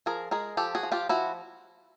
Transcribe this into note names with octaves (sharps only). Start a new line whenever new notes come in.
F3 G#4 A#4
G#3 G#4 A#4
F3 G4 A4
F#4 G#4
F3
F4 G4
F3 E4 F#4